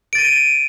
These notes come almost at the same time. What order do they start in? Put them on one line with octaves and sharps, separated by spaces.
D7 A6 D#7